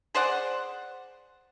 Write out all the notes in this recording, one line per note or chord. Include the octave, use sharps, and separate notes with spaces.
G#4 C5 D5 F#5